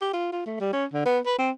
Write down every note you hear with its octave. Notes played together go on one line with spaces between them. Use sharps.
G4
F4
F4
A3
G3
C#4
D3
B3
B4
C4